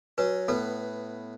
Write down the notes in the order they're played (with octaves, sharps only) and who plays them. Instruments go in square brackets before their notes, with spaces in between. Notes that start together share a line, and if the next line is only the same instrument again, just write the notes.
[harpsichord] F#3 C#4 [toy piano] B4
[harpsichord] A2 B3 [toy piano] A4 B4